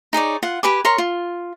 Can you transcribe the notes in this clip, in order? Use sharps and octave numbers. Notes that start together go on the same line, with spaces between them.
D#4 G#4 C#5 D5
F4 F#5
G4 B4 G#5 D6
A#4 C#5 C6
F4